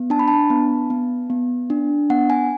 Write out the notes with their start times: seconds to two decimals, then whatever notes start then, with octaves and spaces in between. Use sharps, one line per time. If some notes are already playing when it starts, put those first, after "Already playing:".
Already playing: B3
0.10 D4 A5
0.19 B5
0.28 A5
0.50 B3
0.90 B3
1.30 B3
1.70 D4
2.10 B3 F#5
2.30 G#5